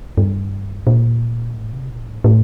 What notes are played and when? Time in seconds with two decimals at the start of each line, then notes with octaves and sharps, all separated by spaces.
0.18 G2
0.87 A#2
1.56 A2
1.73 C3
1.90 A#2
2.07 A2
2.24 A2